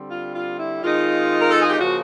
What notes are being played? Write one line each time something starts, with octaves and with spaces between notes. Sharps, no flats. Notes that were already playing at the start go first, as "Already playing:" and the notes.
Already playing: D3 G3 C4
F4
F4
E4
D#3 G#3 C4 D#4 F4
A#4
A4
G#4
G4
C#3 F3 A#3 F#4